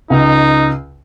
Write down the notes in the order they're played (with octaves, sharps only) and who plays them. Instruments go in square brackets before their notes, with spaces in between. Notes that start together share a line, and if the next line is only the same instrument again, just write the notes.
[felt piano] C#2 [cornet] D#4